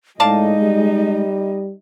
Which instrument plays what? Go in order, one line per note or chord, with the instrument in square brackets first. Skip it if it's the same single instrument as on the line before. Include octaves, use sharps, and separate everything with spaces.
[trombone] A2 [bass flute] G#3 [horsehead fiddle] D#4 D#5 [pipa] D5 F5 A5
[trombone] G3